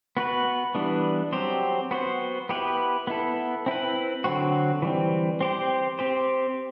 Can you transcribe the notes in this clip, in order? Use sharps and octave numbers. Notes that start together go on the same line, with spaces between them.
B3 F#4 B4
E3 G3 B3 D4
F#3 C4 G4 C5
B3 F#4 C5
B3 E4 G4 B4
B3 E4 A4
C4 E4 B4
D3 F#3 C4 F#4
E3 G3 C4
C4 G4 C5
C4 G4 C5